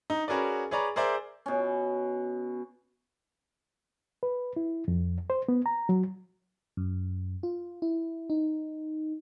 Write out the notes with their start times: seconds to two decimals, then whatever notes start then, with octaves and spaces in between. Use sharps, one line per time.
0.10 D#4
0.28 C#4 F#4 G#4 A#4 B4 D5
0.71 G#4 B4 C#5 D5 A#5
0.96 G#4 A#4 C5 D5 E5
1.46 B2 C#4
4.23 B4
4.56 E4
4.88 F2
5.30 C5
5.49 B3
5.66 A#5
5.89 F#3
6.77 F#2
7.43 F4
7.82 E4
8.30 D#4